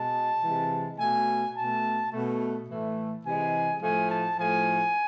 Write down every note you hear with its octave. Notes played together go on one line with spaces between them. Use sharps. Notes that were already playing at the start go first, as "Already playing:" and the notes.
Already playing: B2 G#3 A5
C3 E3 G#3
B2 A3 G#5
B2 A3 A5
B2 A3
A2 E3 A3
C3 E3 G#3 G#5
A2 F3 A3 G#5
A5
A2 F3 A3 G#5